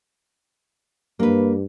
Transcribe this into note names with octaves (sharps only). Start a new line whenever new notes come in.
G2 A#3 B4